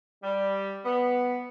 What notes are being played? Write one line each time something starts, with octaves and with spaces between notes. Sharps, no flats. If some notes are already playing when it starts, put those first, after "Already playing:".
G3
B3